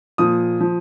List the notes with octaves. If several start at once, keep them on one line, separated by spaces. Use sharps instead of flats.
A#2 F3 D#6
F3